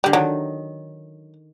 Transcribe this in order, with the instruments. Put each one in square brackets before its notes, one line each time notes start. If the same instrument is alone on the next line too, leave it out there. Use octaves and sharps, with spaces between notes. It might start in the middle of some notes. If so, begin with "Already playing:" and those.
[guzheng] D3 [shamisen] G3
[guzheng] D#3 [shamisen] F#3